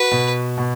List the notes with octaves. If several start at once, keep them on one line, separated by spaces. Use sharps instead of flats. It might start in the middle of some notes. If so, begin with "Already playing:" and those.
Already playing: F#4 B4
B2
B2